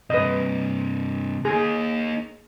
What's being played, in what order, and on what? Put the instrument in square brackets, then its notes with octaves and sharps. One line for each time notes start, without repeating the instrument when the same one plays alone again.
[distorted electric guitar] G2 C3 [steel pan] B4 D#5
[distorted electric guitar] A#3 D#4 [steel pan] G#4